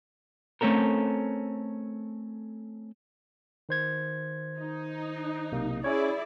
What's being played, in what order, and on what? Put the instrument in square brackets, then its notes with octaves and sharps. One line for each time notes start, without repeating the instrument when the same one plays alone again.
[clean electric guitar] A3 C4 C#4 A4 A#4
[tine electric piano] D#3 C5 G#6
[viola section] D#4
[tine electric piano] B1 C3 A#3
[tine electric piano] C#4 C#5 [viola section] E4 G#4 D5